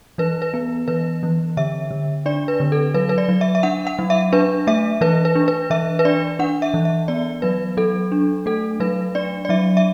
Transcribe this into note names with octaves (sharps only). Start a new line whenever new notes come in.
E3 B4
B4
B3
E3 B4
E3
D3 E5
D3
D4 D5
B4
D3
A4
F#3 B4
B4
D5
F#3
E5
E5
D4 F#5
F#5
F#3
E5
D4 B4
A3 E5
E3 B4
B4
D4
B4
E3 E5
B4
D4 D5
D4 F#5
E5
E3
E5
B3 D5
F#3 B4
F#3 A4
D4
A3 A4
F#3 B4
D4 D5
D5
F#3 E5
E5